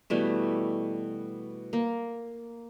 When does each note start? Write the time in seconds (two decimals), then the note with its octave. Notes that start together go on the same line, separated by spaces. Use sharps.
0.10 B2 E3 G3 A3
1.73 A#3